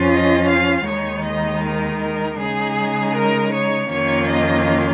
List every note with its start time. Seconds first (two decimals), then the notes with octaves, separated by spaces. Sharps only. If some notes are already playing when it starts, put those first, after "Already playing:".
Already playing: F2 F3 C#4 F4
0.11 D#5
0.48 F5
0.87 D#2 D#3 G#3 D#4 C#5
1.25 D#5
1.63 A#4
2.02 A#4
2.39 C#3 G#3 D#4 G#4
3.15 A#4
3.54 C#5
3.92 F2 D#3 A#3 C#4 F4 C#5
4.30 D#5